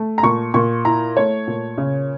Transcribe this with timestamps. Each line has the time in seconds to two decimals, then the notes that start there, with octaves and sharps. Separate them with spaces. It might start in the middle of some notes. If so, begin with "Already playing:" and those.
Already playing: A3
0.18 A#5
0.23 A#2 C#6
0.54 A#2 C#6
0.85 E4 A#5
1.16 A3 C#5
1.47 A#2
1.78 C#3